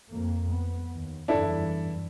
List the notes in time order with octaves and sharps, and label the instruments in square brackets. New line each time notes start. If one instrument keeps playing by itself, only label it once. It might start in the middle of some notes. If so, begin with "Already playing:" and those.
[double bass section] F2 A#3
B3
D#2
[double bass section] F#1 E2 G2 [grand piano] D4 E4 A4